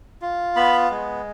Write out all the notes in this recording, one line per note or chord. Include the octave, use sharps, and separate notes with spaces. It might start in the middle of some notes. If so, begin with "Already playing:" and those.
F4
B3 B5
G#3